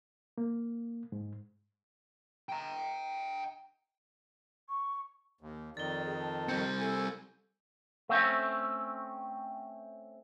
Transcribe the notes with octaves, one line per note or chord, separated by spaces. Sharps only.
A#3
G#2
G5 A#5
C#6
D#2
F2 D#3 D5 A6 G7
G#4
A5
G3 C4 G6 C#7
A4 G#5
A3 C4 C#4